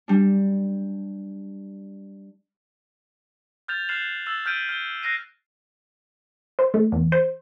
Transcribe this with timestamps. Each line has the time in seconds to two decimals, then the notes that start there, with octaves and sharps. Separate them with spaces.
0.08 G3 D4
3.68 F6 G6 A6 F7
3.89 F6 F#6 A6 C7 E7 F#7
4.26 E6 A6 E7
4.46 F6 G6 B6 D7 D#7
4.69 F6 G7
5.02 F#6 A#6 C7 D#7
6.59 C5
6.74 A3
6.92 E2
7.12 C5